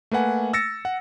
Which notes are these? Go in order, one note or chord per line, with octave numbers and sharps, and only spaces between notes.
A3 A#3 B4 F#5 G#5
E6 A6 A#6 C#7
F#5